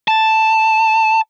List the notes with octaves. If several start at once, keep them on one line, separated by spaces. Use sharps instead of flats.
A5